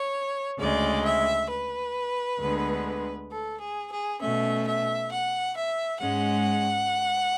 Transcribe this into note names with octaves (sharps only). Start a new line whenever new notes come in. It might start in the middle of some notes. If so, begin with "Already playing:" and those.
Already playing: C#5
D2 C#3 G#3 D5
E5
B4
D2 D3 G#3 B3
A4
G#4
G#4
B2 A3 C#4 E5
E5
F#5
E5
G#2 G#3 C#4 F#5